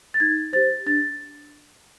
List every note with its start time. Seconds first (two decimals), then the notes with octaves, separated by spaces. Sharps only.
0.14 A6
0.20 D#4 G#6
0.53 G4 C5 A6
0.86 D4 A6